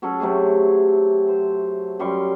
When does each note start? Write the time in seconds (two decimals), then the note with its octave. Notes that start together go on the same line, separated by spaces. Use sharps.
0.02 F#3 C#4 G#4 A4
0.20 C3 F#3 A3 G#4
1.28 C5
1.99 F#2 G3 C6 C#6